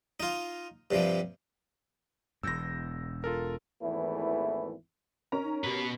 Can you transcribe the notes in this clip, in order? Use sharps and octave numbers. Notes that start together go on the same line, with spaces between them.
D#4 F4
G2 C3 F3 G3
E1 E2 E6 G6 A#6
F4 A4 A#4
G#1 E2 E3 A3 E4
C#4 A#4 A#5
D#4
B2 G4 B4